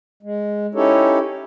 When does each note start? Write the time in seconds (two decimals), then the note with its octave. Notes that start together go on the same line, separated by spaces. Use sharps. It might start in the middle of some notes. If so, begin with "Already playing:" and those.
0.23 G#3
0.75 C#4 D#4 E4 G4 A4 C#5